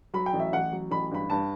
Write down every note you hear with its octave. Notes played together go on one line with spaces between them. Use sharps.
F#3 B5
G5
A1
E5
A1 F#5
F#3
A1 B5
G2 B5
G2 A5